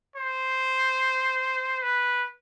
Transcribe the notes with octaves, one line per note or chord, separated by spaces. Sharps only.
C5
B4